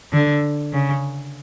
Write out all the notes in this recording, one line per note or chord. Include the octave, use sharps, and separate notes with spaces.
D3
C#3